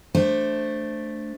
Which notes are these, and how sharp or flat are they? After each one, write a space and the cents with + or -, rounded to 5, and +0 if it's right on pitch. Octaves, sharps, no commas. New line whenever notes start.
A3 +0 D4 +0 C5 +5